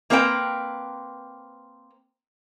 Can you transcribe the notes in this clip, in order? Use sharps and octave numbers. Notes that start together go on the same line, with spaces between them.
A#3 C4 A#4 B4 E5 G5